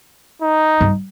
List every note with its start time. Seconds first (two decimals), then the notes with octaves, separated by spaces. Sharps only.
0.42 D#4
0.81 G2